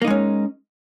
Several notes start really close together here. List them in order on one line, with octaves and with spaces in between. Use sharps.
A#3 D#4 G#3 C#4